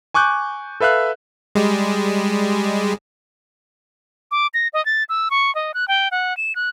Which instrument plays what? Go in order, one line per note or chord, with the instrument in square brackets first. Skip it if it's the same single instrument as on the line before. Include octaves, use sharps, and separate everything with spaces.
[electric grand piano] G#5 C#6 D6 F#6 G6
A4 B4 E5 F5 F#6
[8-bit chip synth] G3 G#3
[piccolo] D6
A#6
D#5
A6
E6
C#6
D#5
F#6
G5
F#5
E7
F#6